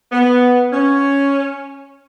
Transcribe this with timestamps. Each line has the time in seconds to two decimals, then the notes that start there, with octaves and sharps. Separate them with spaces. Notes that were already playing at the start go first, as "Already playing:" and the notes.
0.12 B3
0.72 C#4